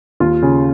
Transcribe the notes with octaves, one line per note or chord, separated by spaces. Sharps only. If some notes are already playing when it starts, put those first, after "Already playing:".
D#2 F4
C#3